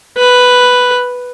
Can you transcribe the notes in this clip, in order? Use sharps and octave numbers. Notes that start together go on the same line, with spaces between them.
B4